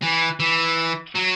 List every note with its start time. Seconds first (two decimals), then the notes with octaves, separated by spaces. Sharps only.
0.03 E3
0.40 E3
1.15 F#3